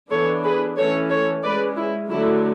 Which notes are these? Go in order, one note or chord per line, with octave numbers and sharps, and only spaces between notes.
E3 B3 D4 A4 C#5
G#4 B4
E3 A3 C#4 A4 C#5
A4 C#5
G#3 C#4 B4 D5
E4
D3 F#3 A3 E4